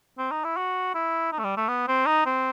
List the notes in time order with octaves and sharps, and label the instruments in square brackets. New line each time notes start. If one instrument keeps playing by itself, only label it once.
[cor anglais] C4
D#4
E4
F#4
E4
D#4
A3
G3
A3
B3
C4
D#4
C4